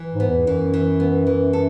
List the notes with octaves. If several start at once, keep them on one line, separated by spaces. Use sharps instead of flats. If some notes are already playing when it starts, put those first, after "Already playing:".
Already playing: E3
G#2
B3
E2
F#2 E3
E3
B3
E3
A4